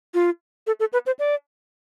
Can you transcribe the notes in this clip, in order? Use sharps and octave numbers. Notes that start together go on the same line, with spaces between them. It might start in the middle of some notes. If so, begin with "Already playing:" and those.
F4
A4
A4
B4
C5
D5